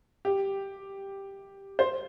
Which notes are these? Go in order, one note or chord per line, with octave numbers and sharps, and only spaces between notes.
G4
C5